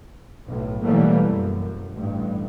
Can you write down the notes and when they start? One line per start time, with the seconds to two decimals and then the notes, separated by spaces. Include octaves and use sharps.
0.47 B1 A2
0.84 B2 E3 F#3 G3 A3 A#3
1.27 F#2
1.94 A1 G2